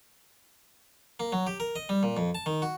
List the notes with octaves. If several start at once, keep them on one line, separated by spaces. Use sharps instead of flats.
A#3
F#3
G4
A#4
D#5
G3
A#2
F2
A5
D#3
F#4